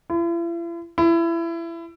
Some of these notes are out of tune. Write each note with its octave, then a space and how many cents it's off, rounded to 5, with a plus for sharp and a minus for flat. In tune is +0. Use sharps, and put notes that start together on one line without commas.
E4 +45
E4 +25